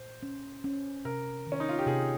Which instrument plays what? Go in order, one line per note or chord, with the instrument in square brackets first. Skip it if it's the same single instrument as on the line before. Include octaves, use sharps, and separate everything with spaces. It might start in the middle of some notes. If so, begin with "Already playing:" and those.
Already playing: [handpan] A#2 [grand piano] C5
[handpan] C#4
C#4
[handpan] C3 [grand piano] A#4
[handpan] D#3
[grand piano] C#4
D#4
F4
G4
[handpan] C3 [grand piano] G#4